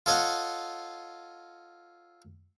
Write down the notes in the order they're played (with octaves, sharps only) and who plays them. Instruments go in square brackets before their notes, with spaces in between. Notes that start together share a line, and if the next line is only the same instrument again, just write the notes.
[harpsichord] F4 A4 C#5 D#5 F5 F#5